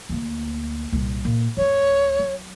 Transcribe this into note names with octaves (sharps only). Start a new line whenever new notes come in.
D2 A#3
C2 A#2
A#2
D1 F2 C#5
F#3